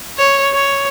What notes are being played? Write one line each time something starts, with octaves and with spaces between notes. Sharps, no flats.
C#5
C#5